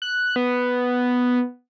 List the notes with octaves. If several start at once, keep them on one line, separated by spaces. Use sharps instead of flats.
F#6
B3